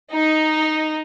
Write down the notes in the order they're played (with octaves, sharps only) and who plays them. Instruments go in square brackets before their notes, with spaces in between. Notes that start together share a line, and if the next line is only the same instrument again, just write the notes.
[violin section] D#4